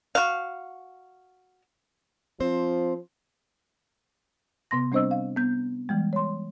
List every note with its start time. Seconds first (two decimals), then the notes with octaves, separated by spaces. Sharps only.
0.15 F#4 F5
2.40 F3 C4 C5
4.71 C3 B3 C6 A#6
4.92 G3 C4 D4 C5 D#5 E6
5.11 F5
5.37 B3 G6
5.89 E3 G3 G#3
6.13 C#5 C6